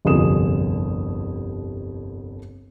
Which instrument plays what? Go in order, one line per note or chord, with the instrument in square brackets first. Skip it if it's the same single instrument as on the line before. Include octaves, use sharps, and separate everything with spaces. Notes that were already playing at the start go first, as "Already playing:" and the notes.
[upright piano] G1 C2 F2 G#4 D#6 E7